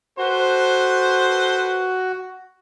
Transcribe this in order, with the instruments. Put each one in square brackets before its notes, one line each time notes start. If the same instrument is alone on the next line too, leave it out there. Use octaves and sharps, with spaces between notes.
[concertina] F#4 [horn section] A4 B4 C5